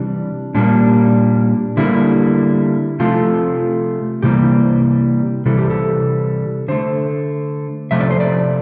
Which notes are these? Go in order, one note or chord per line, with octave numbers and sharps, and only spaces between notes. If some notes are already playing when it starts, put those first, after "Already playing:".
Already playing: C3 E3 G3 D4
A#2 G3 A#3 D4
D3 G3 A#3 E4
C3 F3 A3 F4
C3 E3 G3 A#3 G4
C3 E3 G3 A4
G4
A4
D3 A3 C5
C3 F3 A3 E5
D5
C5
D5